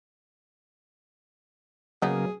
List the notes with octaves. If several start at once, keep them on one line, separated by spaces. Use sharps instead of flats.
C#3 F#3 A#3 B3 D#4 G#4